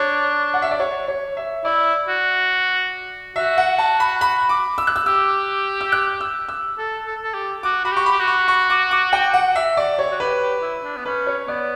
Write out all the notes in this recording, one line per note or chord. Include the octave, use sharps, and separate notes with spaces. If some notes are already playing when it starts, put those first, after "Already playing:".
Already playing: D4 C#5
F#5
E5
D5
C#5
C#5
E5
E4 D5
F#4
F#4 E5
F#5
A5
B5
B5
D6
E6
F#6
E6
G4 E6
E6
F#6
E6
E6
A4
A4
A4
G4
F#4 D6
F#4 B5
G4 C#6
B5
G4
F#4
C#6
C#6
D6
D6
G5
F#5
E5
D5
C#5
F#4
G4 B4
G4
E4
D4
B3
C#4 B4
C#5
B3 D5